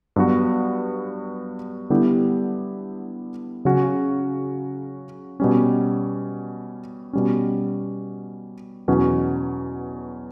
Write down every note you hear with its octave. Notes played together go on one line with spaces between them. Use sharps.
G2 F#3 B3 F#4
D3 G3 B3 E4 G4
C#3 F#3 C#4 F#4
B2 G3 C#4
B2 G3 C#4
E2 B2 F#3 C#4 F#4